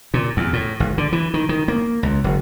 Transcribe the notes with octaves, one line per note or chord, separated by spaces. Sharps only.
A#2
E2
A2
G#1
D3
E3
D#3
D#3
A#3
C#2
F#1